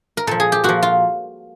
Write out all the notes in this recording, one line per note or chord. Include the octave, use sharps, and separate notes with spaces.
A#4
A#2 F3 A4
G#4
G4
A#2 F3 F#4
F4